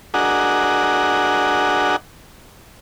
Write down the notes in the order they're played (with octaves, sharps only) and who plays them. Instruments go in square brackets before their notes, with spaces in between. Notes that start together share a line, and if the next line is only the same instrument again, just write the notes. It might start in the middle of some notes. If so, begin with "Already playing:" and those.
[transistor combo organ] D4 F#4 G#4 A#4 D#5 F#5